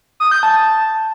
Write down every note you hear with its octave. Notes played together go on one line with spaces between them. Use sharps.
D#6
G6
A5